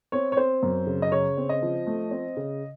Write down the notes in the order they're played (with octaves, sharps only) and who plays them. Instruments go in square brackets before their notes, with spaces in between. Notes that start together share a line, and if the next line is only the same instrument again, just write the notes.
[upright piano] C4 C#5
C#5
C4 C5
F#2
C#3
D#5
C#3 C#5
C4
D#5
F3
A3
C4
C#3